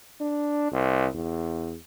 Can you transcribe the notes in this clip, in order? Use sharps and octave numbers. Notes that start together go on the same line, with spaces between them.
D4
C2
E2